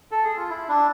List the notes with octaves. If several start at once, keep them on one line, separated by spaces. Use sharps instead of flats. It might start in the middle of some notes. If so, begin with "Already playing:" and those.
A4
G#4
F4
E4
D4